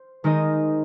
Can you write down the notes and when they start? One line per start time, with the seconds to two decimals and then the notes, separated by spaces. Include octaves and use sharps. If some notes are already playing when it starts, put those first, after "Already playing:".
Already playing: C5
0.24 D#3 G#3 D#4 C5 D#5